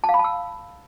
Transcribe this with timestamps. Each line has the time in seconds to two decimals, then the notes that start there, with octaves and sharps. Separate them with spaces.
0.04 A5
0.09 F5
0.14 B5
0.19 A5
0.24 E6